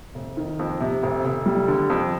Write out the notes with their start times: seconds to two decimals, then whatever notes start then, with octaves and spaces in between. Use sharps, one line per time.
0.15 F1
0.37 D#3
0.59 F2
0.80 C3
1.03 F1
1.25 F1
1.46 G3
1.68 D3
1.90 F2